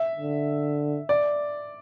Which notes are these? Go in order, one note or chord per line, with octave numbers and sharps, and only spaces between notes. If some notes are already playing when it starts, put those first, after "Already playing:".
Already playing: E5
D3
D5